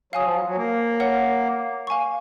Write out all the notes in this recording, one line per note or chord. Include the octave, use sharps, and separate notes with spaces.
F#3 F5 G#5 D#6
F3
F#3
F#3
A#3
A#4 C#5 F#5
F5 G#5 C#6